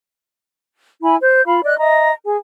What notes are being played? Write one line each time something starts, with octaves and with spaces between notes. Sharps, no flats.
E4 G#5 B5
C5 G6
F4 F5 B5
D5 D#5 F#6
D#5 E5 A#5
G#4 G#5